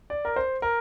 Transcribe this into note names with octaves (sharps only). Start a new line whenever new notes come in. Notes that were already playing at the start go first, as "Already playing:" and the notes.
D5
A#4
C5
A#4